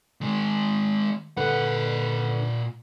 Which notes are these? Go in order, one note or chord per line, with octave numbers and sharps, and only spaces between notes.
D#3 G#3
G2 A#2 D3 B4 F#5